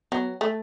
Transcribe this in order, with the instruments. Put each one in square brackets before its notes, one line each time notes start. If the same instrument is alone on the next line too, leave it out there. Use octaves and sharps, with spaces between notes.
[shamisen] F#3 [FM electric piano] B3
[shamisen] A3